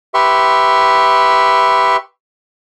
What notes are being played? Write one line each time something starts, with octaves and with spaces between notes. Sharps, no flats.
G4 B4 E5 C6 C#6